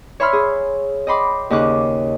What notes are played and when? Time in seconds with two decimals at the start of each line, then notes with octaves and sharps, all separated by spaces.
0.20 C#5 E5 B5 C6 E6 F6
0.33 G#4
1.07 D#5 G5 B5 C6 D6
1.50 D#2 C#3 D6 F#6